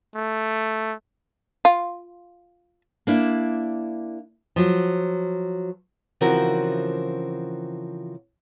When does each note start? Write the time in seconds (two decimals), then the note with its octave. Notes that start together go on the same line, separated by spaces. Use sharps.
0.16 A3
1.65 F4
3.07 A#3 D4 E4
4.56 F3 F#3
6.21 C#3 E3 F3 C4 F#4 A#4